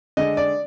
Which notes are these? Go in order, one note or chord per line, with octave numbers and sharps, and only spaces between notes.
D3 G#3 D#5
D5